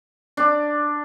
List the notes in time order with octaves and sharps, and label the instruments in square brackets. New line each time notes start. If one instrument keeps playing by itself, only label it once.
[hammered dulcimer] D4